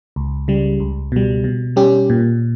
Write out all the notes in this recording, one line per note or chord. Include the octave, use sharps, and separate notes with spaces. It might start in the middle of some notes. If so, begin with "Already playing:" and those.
C#2
C#3 G3
C#2
B2 G3
B2
G3 C#4 G4
A#2